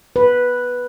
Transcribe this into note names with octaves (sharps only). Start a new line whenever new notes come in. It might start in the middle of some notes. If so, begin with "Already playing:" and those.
B4